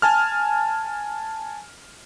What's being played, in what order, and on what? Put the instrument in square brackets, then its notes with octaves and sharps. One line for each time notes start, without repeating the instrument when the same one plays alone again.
[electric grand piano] G#5 A5 F6